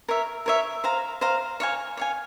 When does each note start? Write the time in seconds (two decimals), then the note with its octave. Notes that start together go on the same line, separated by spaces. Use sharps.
0.08 A#4 C#5 E5
0.46 A#4 C#5 E5
0.84 C5 F5 A#5
1.21 C5 F5 A#5
1.60 C#5 F5 G#5
1.97 C#5 F5 G#5